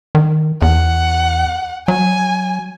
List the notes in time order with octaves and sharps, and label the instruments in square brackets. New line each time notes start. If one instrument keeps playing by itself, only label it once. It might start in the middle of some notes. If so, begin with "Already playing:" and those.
[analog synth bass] D#3
[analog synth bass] E2 [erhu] F#5
[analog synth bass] F#3 [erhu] G#5